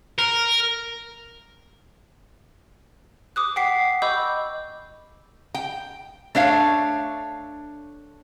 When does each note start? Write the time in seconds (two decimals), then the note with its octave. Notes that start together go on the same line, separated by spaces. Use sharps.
0.19 A#4
3.36 D6 D#6 F#6
3.56 F#5 G5 D6 B6 C7
4.02 D#5 B5 C#6 D6 E6 G6
5.54 G5
6.35 A3 D4 C#5 F5